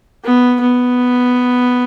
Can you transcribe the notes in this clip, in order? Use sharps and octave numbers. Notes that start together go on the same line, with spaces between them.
B3
B3